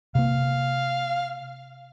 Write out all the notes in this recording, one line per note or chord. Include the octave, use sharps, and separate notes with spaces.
C3 A#3 F5